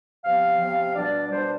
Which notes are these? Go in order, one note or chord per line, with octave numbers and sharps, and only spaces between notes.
C3 F3 B3 F5
C3 F3 B3
B2 G3 D4 D5
B2 G3 D4 C5